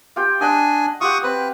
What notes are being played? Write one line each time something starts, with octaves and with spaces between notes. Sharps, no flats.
F4 G4 G5
D4 D#5 F#5 G#5
F4 G4 F#5 C#6 D#6
C4 B4